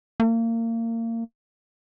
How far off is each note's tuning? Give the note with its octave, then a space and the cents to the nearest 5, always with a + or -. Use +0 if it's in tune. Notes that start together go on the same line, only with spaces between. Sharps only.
A#3 -30